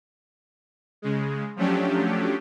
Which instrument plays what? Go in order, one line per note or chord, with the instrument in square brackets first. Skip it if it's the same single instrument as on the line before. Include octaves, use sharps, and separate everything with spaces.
[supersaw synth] C#3 G#3
F3 F#3 A3 C#4 D4 G4